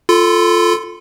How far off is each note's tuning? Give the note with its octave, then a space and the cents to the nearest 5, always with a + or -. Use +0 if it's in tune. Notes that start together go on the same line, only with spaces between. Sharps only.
F4 +0 A4 +0 B5 +45